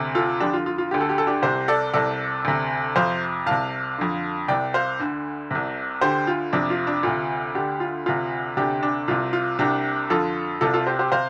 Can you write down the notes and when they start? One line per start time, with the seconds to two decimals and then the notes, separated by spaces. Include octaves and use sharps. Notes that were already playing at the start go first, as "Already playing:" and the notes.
Already playing: D2 C3
0.15 F4 A4
0.40 F2 D3 D4 G4
0.54 F4
0.66 F4
0.78 F4
0.91 D2 D3 G4
1.01 A4
1.09 G4
1.18 A4
1.27 D4 G4
1.42 C2 C3 G4 C5
1.68 A4 D5
1.93 C2 C3 A4 D5
2.45 D2 C3
2.96 F2 C3 C5 F5
3.46 C2 C3 F5 A5
3.98 F2 D3
4.48 C2 C3 D5 G5
4.74 C5 F5
5.00 D2 D3
5.51 C2 C3
6.01 D2 D3 G4 C5
6.27 F4
6.53 F2 C3 D4
6.70 F4
6.87 D4
7.03 D2 C3 F4
7.55 D2 D3 D4 G4
7.80 F4
8.06 D2 C3 F4
8.57 D2 C3 D4 G4
8.83 D4
9.08 C2 C3 F4
9.33 F4
9.59 C2 C3 D4 G4
10.10 F2 D3 F4 A4
10.61 C2 C3 F4 A4
10.73 F4 A4
10.87 G4 C5
10.99 G4 C5
11.12 C3 C5 F5